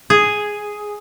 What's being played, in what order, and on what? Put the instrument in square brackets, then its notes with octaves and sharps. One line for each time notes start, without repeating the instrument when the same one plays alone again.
[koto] G#4